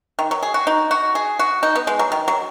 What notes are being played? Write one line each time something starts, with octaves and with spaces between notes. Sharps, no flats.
D#3
F#3
G#4
F#4
D#4
F#4
G#4
F#4
D#4
B3
G#3
F#3
D#3
F#3